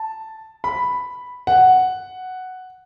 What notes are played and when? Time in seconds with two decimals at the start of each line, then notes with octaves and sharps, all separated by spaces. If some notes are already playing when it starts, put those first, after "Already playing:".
Already playing: A5
0.64 B5
1.47 F#5